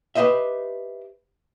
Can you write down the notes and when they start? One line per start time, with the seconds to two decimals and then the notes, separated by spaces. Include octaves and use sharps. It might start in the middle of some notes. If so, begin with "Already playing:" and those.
0.15 G4 B4 C5 D#5 E5